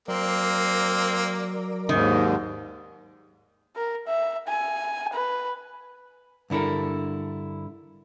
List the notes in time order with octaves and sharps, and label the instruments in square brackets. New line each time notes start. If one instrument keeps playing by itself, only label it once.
[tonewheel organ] F#3 A#4 D5 [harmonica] A#3 C4
[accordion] D#2 G#2 [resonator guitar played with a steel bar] D#3
[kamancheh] A#4
E5
G#5
B4
[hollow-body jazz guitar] G2 D3 E4 A4 A#4